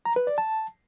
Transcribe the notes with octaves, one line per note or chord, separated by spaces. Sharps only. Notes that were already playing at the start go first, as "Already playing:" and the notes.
A#5
B4
D5
A5